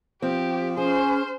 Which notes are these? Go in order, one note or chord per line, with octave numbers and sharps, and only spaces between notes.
F3 C4 G4
C#4 G#4 C5